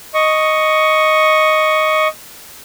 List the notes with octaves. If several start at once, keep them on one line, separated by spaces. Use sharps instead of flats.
D#5 C#6